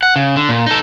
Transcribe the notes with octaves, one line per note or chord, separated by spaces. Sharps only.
F#5
C#3
D3
A#2
D#4 A4